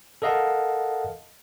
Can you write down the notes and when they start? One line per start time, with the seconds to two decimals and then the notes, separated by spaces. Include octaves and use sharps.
0.22 A4 A#4 D#5 F5 F#5 A5